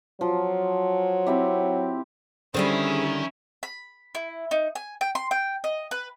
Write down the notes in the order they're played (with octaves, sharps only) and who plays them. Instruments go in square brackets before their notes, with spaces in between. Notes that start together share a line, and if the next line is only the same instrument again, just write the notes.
[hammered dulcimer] F3 [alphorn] F#3
[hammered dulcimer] C4 E4 G4
[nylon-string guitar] D3 G3 [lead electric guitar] D#3 [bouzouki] C4 G#4 E5 [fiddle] C#4 E4
[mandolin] B5
E4
D#4
G#5
G5
C6
G5
D#5
B4